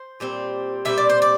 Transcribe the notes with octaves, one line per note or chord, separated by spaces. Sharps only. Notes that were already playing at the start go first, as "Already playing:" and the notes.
Already playing: C5
A#2 G3 C4
A#2 G3 C4 E5
D5
C5
D5